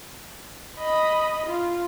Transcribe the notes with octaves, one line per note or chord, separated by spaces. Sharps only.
D#5 B5
F4